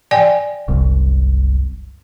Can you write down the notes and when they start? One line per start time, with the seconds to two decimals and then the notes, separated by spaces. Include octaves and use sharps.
0.11 D5 G5 G#5
0.68 F#1 C2